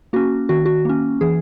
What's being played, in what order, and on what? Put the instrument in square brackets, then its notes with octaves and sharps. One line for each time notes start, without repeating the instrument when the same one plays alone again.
[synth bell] A#3 C#4 F#4
D#3 F#4
F#4
A#3 C#4
E3 G#4